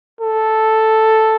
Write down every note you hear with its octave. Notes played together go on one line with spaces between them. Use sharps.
A4